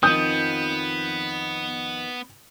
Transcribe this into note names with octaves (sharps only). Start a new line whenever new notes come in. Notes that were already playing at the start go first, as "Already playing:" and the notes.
F2 D#3 F3 B3 D#6 G6